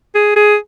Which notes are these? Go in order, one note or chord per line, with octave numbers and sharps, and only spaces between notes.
G#4
G#4